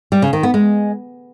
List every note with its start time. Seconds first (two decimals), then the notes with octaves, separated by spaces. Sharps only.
0.12 G3
0.22 C#3
0.33 D#3
0.43 B3
0.54 G#3